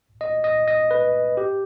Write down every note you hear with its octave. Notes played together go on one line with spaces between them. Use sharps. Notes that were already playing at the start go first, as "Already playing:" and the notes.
D#5
D#5
D#5
B4
G4